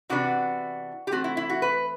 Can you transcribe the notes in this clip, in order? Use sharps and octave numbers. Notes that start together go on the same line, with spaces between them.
C3 E3 B3 D4 F#4
G4
E3 A3 C4 F#4
E4
E4
F#4
B4